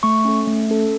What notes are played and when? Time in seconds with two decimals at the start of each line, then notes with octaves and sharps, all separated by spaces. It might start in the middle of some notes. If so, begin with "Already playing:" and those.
0.03 A3 C#6
0.25 C#4 A4
0.47 A3
0.70 C#4 A4